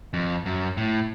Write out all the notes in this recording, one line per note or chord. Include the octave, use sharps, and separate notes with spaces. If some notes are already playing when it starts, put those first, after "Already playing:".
F2
F#2
A2